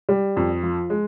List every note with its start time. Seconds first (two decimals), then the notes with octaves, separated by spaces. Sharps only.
0.09 G3
0.36 F2
0.63 F3
0.90 G#3